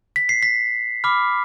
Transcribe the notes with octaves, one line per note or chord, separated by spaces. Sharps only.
B6
C7
B6
B5 D6 F6